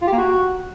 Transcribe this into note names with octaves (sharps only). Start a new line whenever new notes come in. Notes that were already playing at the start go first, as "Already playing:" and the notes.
F4
G4
A#3
F#4